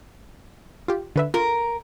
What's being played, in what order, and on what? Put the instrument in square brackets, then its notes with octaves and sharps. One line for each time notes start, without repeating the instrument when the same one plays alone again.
[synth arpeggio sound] F4 G4
D3 B4 E5
[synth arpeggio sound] F4 [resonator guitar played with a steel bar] A#4